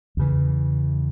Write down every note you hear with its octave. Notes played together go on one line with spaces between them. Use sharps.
E2 C#3 E3